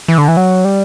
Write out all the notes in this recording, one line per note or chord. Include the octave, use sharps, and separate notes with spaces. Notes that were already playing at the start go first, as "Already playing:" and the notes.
E3
D3
E3
F#3
G3